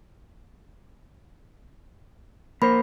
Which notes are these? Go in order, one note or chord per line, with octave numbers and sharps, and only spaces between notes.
A#3 A#4 C5 B5